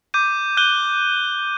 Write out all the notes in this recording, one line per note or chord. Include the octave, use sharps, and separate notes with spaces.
D6 G6 D#7
F#6 G6 D#7 G7